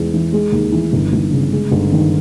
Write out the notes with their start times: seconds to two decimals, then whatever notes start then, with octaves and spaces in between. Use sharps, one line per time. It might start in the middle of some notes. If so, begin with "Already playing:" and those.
Already playing: E2 G#3
0.14 E3
0.33 G#3
0.52 D#2
0.72 E3
0.93 G1
1.13 G1
1.32 C#3
1.52 G#3
1.72 G1
1.92 D#3